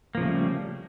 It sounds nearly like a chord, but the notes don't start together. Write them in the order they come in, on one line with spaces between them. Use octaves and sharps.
A#3 F3 C#3 A3 G3